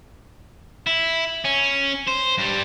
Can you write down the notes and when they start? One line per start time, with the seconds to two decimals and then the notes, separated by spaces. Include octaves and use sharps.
0.87 E4
1.45 C#4
2.08 C5
2.38 G2 G3